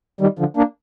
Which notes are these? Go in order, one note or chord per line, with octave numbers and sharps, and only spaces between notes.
D#3 G3
D3 F3
A#3 D4